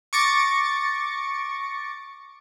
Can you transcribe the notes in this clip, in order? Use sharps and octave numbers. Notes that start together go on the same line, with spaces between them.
C#6 D6 A6 A#6 C#7